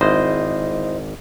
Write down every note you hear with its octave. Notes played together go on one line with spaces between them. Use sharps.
G#1 E4 C5 D#5